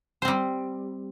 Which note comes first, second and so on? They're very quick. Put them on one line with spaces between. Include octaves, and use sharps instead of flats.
C5 C4 G3